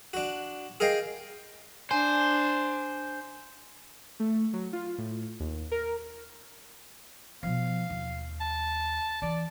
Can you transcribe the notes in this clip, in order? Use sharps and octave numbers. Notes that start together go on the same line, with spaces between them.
D4 F#4
G#4 A#4 D#5 F5 G5
D4 C5 G#5
A3
F#3
F4
A2
D#2
A#4
B2 F3 F5
D#2
A5
E3 D5